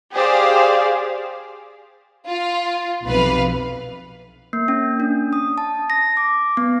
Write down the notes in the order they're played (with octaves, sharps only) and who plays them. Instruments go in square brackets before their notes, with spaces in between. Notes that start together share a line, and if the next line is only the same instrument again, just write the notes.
[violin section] G4 G#4 C5 D5 F5
[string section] F4
B1 F2 C3 B4 F5
[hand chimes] A#3
C#4
D4
D#6
A5
A#6
D6
B3